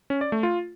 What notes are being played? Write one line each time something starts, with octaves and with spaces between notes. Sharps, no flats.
C#4
D5
A3
F4